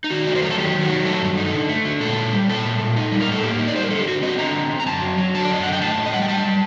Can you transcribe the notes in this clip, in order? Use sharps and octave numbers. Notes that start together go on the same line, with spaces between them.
D#4
D#3 F#4
A3 D5
C5
F#3 A#4
A4
D#3 G4
D#3
F#4
F#3
A3 A4
G2
D#4
D3
A3
D3
A#2 A4
A#2
G3
A#2 A4
A#2
A#2
D#4
G3
A#4
A2 A4
A#3 G4
D#4
D5
G3 C5
A#4
D3 A4
G4
D3 F#4
C4 D#5
D3 A#5
C4
C4
A#5
F#2 A5
F#3
F#3
D3 A5
D5
F#2 D#5
D3 F#5
G5
A2 A5
A2
D#5
G3 F#5
G5
G3 A5
G3